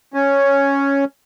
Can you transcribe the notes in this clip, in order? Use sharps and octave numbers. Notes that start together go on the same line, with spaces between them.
C#4